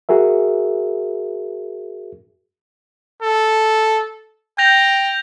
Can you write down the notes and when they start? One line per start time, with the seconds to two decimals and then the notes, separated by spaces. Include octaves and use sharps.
0.09 F#4 G#4 A#4 E5
3.23 A4
4.58 G5 G6 A#6 F7